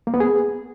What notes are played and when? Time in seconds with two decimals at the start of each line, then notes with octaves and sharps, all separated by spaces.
0.07 A#3
0.14 B3
0.20 G#4